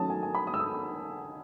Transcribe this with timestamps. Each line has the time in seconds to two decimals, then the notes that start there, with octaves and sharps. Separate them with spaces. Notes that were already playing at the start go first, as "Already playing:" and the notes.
Already playing: D#3 F#3 A3 C#4 A5 D#6
0.10 G#5
0.23 G#5
0.35 B5
0.47 D#6
0.54 E6
0.60 D#6